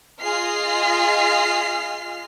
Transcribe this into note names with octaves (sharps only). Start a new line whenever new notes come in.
F4 G#4 D#5 F6 C7